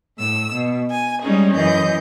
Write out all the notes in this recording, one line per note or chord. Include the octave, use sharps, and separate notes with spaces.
A2 E6
B2
G#5
G3 G#3 C#4 D#4 G#4
F#2 E3 D#5 G6